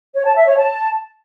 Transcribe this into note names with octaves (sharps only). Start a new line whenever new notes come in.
C#5
A5
E5
C#5
A5